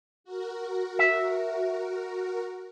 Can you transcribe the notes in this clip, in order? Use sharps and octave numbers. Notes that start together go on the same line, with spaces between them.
F#4 A#4
E5